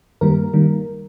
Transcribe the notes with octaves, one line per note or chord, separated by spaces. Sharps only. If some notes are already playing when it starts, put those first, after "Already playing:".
G2 D#3 G3 A#3 A#4
D#3 G3 A#3